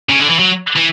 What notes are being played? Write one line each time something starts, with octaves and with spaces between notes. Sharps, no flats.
C#3
D3
E3
F#3
E3